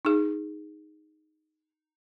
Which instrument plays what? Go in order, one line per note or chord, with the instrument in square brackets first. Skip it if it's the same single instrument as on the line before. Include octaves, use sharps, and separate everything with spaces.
[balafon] D#4 G#4